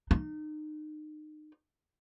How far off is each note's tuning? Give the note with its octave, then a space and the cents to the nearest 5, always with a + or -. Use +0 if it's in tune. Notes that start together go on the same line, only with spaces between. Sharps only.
D#4 -30